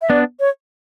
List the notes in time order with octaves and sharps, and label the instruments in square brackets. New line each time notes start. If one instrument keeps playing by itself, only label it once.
[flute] E5
[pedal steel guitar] B3 D4 [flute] D5
[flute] C#5